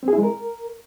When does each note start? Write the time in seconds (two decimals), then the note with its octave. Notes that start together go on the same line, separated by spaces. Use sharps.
0.03 C4
0.08 G#4
0.13 E4
0.18 G#3
0.23 A#4